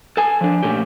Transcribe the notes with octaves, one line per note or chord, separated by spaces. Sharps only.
A4 G#5
F3 D4
A#2 A3 C#4 G4